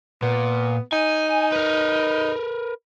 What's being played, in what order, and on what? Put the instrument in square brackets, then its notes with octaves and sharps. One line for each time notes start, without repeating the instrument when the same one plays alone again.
[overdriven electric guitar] A#2 [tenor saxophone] B3
[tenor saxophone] D#4 [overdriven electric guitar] G#5
[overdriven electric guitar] A#4 B4